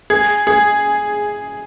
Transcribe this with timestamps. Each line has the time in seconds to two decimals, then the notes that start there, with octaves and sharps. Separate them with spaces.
0.10 G#4
0.47 G#4